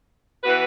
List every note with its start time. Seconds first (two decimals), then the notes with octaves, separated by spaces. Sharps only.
0.44 E3 B3 F#4 B4